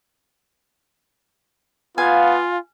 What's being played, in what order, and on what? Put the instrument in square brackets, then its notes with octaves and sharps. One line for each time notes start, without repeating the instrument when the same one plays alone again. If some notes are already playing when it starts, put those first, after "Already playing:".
[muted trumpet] B3 [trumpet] F4 [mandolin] F5 [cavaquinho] G#5